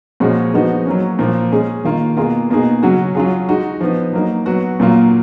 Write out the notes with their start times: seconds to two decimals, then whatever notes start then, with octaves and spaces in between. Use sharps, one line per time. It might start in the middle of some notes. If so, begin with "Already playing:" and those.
0.20 A#2 F3 G#3 C#4 F#4
0.54 F3 G#3 B3 D#4 F#4
0.86 F#3 A#3 C#4
1.19 A#2 F3 A#3
1.52 G#3 C#4 G#4
1.85 D#3 A#3 F4
2.17 B2 A#3 F4 G#4
2.50 B2 A#3 D#4 G#4
2.83 C#3 F#3 C#4 F#4
3.15 F#3 C#4 F4 G#4
3.49 G#3 D#4 F#4
3.81 F3 B3 D#4
4.13 F#3 A#3 D#4
4.46 F#3 B3 F#4
4.80 A#2 F#3 A#3 F4